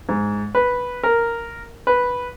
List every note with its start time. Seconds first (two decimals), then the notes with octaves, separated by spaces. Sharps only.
0.09 G#2
0.55 B4
1.03 A#4
1.87 B4